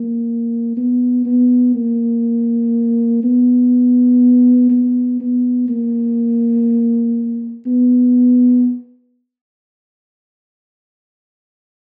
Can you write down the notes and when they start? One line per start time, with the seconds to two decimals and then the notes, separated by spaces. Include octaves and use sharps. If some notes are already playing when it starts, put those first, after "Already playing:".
Already playing: A#3
0.77 B3
1.26 B3
1.75 A#3
3.24 B3
4.70 B3
5.20 B3
5.69 A#3
7.66 B3